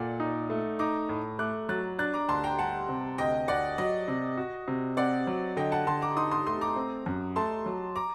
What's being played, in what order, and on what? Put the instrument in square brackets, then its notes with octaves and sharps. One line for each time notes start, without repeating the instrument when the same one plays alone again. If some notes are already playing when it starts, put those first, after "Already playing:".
Already playing: [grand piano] A#2 A4 [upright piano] D5 F#5
[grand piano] D#4
A3
[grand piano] D#4 [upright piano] A#5 D6
[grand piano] A2
[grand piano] A3 [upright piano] D6 F#6
[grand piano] F#3 [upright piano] F#6 A6
[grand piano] D4 [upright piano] F#6 A6
[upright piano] A#5 D6
[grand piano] D2 [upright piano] A5 C6
[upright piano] G5 A#5
[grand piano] G3 [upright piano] F#5 A5
[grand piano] C3
[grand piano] D2 [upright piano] D#5 G5
[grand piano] D2 [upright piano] D5 F#5
[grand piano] F#3 [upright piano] D#5
[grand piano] C3
F#4
C3
[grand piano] C4 [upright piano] D5 F#5
[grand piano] F#3
[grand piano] D3 [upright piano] D#5 G5
[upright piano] F#5 A5
[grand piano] D3 [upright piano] A5 C6
[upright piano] A#5 D6
[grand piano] D#4 [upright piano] C6 D#6
[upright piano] C6 D#6
[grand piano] A3 [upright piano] C6 D#6
[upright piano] A#5 D6
[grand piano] C4
F#2
[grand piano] A3 [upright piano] A5 C6
[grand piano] F#3
[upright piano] A#5 D6